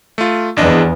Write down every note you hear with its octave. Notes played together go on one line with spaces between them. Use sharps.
A3 F4
G#1 E2 D4 D#5